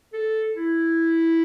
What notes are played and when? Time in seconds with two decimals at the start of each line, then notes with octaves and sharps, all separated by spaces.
0.13 A4
0.56 E4